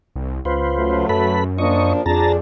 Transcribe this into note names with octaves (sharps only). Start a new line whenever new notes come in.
C2
C#2 F4 B4 C5
F#3 A3
F#2 A4 B4 B5
F3 A#3 D4 D#5 C#6
F2 D4 F4 G#4 A5 A#5